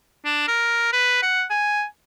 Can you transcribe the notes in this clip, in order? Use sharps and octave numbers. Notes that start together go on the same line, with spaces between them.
D4
A#4
B4
F#5
G#5